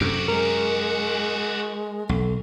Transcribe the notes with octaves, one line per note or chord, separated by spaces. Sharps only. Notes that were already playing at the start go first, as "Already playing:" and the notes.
F#2 C3 F#4 G4 A4
G#3 A#4
B1 A4